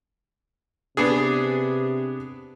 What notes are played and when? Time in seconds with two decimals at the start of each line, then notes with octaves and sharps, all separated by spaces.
0.97 C3 B3 D4 G#4